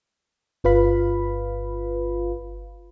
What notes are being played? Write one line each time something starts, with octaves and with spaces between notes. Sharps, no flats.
G1 F4 B4 F5 B5